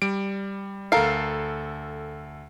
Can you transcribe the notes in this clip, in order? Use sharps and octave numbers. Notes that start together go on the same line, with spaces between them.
G3 D7
D2 A4 A#4 F5 C7